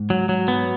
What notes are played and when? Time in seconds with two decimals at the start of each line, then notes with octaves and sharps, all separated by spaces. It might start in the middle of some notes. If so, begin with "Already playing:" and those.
Already playing: G#2
0.10 F#3
0.29 F#3
0.48 B3